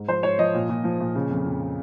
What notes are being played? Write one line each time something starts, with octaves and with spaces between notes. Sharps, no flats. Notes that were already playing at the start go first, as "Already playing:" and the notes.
Already playing: G#2
F3 C5
G#2 C#5
F3 D#5
A#2
A#2
F3
A#2
C#3
F2
F2